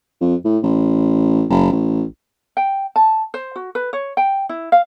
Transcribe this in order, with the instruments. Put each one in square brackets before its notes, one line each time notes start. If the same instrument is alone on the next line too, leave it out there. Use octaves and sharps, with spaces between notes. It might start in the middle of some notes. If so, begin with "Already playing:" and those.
[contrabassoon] F2
A2
A1
F#1
A1
[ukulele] G5
A5
C5
F#4
B4
C#5
G5
E4
F5